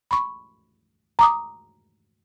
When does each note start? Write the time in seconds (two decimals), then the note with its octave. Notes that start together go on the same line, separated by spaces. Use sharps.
0.11 B5 C#6
1.19 A#5 D6 D#6